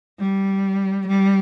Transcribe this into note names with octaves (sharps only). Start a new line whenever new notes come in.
G3
G3